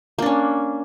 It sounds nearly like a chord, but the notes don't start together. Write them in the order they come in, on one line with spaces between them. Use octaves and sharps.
A#3 D4 C#4